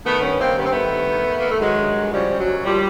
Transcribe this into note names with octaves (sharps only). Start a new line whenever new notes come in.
D#3 A3 B3
G2 B3 C#4
D#3 A#3 C4
G2 B3
C4
D#3 A3 B3
G2
D#3
D#3
D#3 A#3
A3
D#3 F#3 G#3
G2
G2
C#3 F3 G3
C#3
F#3
D#2
D#2 F3 G3